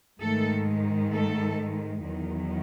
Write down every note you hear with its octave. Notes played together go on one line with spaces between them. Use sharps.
G#2 D#3 G#3 A3 A4
A3 A4
E2 D#3 F#3